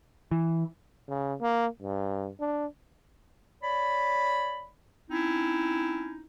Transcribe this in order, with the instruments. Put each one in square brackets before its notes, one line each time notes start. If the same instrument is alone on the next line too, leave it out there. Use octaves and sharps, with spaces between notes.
[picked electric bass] E3
[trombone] C#3
A#3
G2
D4
[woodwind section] C#5 D5 B5
C4 C#4 D#4 E4